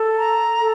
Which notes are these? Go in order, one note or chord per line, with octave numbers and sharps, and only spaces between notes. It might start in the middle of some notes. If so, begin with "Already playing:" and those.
Already playing: A4
A#5
A4